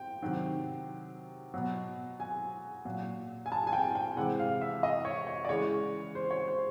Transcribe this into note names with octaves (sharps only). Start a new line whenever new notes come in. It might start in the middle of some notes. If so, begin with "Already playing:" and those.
Already playing: G5
C3 D#3 F#3
B2 F#3
G#5
A#2 F#3
G#5
A5
G#5
G5
G5
C3 E3 G#3 F#5
F5
E5
D#5
C#5
C#5
D5
C#3 E3 G#3 C#5
C5
C#5
C5